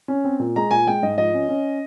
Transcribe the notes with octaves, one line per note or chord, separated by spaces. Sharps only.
C#4
C4
A#2
G#3 A#5
A#2 G#5
G#3 G5
G#2 D#5
F3 D#5
C#4
C#4